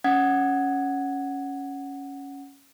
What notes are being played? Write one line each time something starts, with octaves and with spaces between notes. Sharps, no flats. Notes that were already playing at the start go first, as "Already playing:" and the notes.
C#4 F#5 G#6